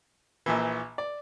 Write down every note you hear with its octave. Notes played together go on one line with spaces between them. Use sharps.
A#1 A#2 E3
D5